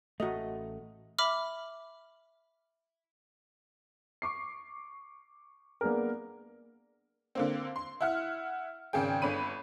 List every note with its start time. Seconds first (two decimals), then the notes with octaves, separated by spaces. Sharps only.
0.20 A1 A3 F#4 D#5
1.19 E5 B5 D6 F6
4.22 C#6 D6 C7
5.81 A#3 B3 D4 G#4 A#4
7.35 D3 A#3 C4
7.76 C6
8.01 E4 F#5 F6
8.93 G#1 C#3 G#4 G5
9.22 G1 D3 C#5 B5 D#7